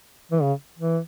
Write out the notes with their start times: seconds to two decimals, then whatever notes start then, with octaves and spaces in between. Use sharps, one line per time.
0.32 E3
0.42 C#3
0.78 E3